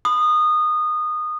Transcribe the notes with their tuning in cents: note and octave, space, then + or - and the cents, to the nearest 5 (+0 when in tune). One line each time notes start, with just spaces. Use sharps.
B5 +30 D#6 -20